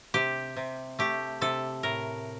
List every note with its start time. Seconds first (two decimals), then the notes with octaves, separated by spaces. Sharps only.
0.14 C3 G4
0.56 C3
0.99 A3 G4
1.41 C3 A4
1.83 A2 A#4